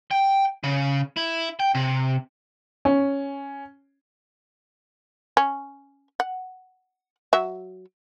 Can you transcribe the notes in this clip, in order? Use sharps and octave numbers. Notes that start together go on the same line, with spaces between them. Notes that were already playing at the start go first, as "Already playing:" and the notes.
G5
C#3
E4
G5
C3
C#4
C#4
F#5
F#3 E5